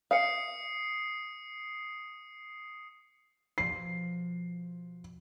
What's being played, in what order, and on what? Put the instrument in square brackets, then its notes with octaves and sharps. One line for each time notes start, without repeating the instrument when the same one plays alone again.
[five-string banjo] F5 [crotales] D#6 C7 C#7
[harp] B2 F3 [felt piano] C7